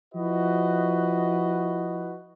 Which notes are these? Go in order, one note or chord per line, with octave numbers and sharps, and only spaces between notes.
F3 E4 F#4 B4 D#5